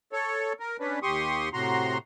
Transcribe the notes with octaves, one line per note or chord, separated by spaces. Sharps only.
A4 C#5
A#4
C#4 D4 B4
D#2 G4 C6 C#6 D#6
A2 C3 F#4 A#5 C6